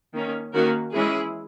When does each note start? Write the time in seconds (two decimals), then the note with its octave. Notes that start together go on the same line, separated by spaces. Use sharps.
0.15 D#3 A#3 C#4
0.54 D#3 A#3 C#4 F#4 A#4
0.93 E3 G#3 C#4 E4 G#4